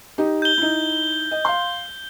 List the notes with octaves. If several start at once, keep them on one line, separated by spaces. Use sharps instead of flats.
D#4 G4
G6 G7
D#4 E4
D#5
F5 C6